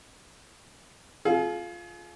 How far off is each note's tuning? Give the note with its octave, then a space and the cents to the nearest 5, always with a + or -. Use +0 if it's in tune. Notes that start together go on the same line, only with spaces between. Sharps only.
F4 +0 G#4 +40